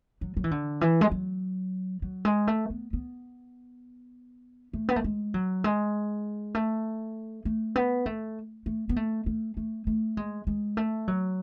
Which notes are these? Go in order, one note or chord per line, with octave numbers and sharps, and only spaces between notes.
F#3
F#3
E3
D3
E3
G#3
F#3
F#3
G#3
A3
B3
B3
A3
B3
A3
G#3
F#3
G#3
A3
A3
B3
A3
A3
B3
A3
A3
A3
A3
G#3
G#3
A3
F#3